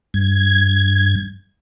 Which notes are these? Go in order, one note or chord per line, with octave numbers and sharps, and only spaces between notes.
G2 G#6